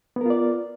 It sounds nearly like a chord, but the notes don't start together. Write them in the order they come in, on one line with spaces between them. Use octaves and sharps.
B3 A#4 F4 D5